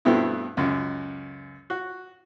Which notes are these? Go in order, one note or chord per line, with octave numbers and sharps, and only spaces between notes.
G2 B2 A3 B3 C4 E4
C#2 F#2
F#4